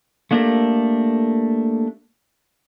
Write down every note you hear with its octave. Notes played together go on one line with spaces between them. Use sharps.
A3 A#3 D4 G4 A4 A#4